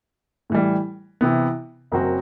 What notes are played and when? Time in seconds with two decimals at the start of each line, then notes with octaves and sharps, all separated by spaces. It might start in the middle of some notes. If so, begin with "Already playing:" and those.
0.50 A2 E3 G3
1.21 C3 E3 B3
1.92 F#1 F#2 F#3 C4 F#4